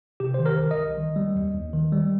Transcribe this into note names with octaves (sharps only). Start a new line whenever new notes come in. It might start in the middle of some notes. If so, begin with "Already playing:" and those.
C3 G4
D#3 C5
A#4
C2
D#5
C2
D#3
G3
D#2
D#2
D#3
G3